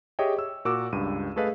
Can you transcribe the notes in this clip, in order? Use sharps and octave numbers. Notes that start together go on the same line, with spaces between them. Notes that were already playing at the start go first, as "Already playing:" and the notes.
G4 G#4 C#5 D#5 E5 G5
C#5 E6
A#2 F#4 A#4 D6 E6
C#2 G2 D#7
A3 G#4 A4 B4 D#5 F5